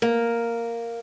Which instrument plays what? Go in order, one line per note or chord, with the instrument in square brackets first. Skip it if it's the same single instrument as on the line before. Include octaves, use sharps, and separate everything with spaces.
[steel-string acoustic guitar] A#3